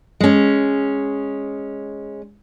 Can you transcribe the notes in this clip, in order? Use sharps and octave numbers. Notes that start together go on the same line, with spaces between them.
G#3 C#4